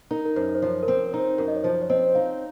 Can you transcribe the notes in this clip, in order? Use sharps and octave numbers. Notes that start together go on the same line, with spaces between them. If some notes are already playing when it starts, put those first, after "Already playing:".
D#4 A#4
A#4
F#2 C5
C5
F3 C#5
A#4
C4 C5
D#4 C5
F#2 A#4
D#5
C#5
F3 C5
C#5
C4 D#5
D#4 F5